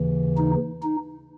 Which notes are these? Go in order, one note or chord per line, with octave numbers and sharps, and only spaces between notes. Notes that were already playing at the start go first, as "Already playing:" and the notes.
Already playing: D#2 C#3 E3
D#4
D#4